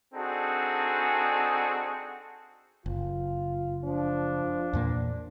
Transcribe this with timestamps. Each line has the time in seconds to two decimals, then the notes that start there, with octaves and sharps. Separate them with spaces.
0.14 C4 D4 D#4 F#4 G#4 A4
2.86 F#1 F4
3.84 F3 D4
4.73 E2 A#2 A#3